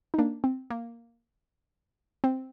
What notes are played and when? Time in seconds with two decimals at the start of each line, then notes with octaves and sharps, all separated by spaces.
0.14 D#4
0.19 A#3 D4
0.44 C4
0.70 A#3
2.24 C4